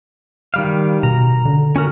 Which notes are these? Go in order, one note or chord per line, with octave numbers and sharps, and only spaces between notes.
D#3 G3 F5
B2 A#5
D3
C#4 F#4 A#4